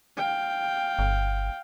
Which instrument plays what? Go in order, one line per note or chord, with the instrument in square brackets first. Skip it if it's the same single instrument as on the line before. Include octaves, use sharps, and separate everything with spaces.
[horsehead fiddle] F5 G5
[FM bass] G1